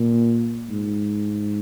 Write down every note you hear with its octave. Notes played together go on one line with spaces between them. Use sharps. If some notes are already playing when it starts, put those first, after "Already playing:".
Already playing: A#2
G#2